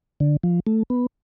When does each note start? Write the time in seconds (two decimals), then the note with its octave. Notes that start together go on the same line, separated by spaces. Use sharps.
0.20 D3
0.43 F3
0.67 A3
0.90 B3